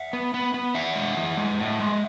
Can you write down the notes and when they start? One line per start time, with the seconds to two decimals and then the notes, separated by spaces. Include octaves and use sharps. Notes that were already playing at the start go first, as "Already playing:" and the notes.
Already playing: E5 F#5
0.13 B3
0.34 B3
0.54 B3
0.75 E3 E5 F#5
0.96 G#3
1.17 E3
1.37 G#3
1.59 A2
1.80 G#3